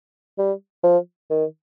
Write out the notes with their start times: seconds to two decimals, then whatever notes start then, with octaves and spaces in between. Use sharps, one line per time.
0.39 G3
0.84 F3
1.31 D#3